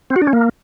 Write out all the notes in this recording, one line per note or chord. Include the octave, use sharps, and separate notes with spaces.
C4
F#4
D4
C#4
A#3